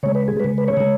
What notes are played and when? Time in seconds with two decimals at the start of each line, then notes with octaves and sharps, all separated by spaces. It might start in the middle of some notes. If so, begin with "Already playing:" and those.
0.03 C#3 G#3 C#5
0.15 B4
0.28 G#4
0.40 C#3 G#3 B4
0.58 B4
0.68 C#5
0.77 C#3 G#3